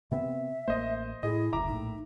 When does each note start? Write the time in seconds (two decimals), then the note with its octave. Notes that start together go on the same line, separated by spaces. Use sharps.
0.11 C3 B3 C4 E5
0.68 A1 A#3 C5 D#5
1.23 A2 E4 G#4 D#5
1.53 F#1 D2 E5 A#5 D6
1.68 A#1 A2 D#4